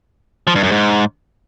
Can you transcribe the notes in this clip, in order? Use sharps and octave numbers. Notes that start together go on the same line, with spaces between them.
F3
G2
F#2
G#2